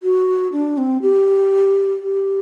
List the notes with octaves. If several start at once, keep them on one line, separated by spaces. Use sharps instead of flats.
F#4
D4
C4
G4
G4